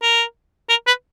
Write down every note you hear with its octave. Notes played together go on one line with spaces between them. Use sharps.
A#4
A#4
B4